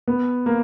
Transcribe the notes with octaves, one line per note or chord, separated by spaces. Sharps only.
B3
A#3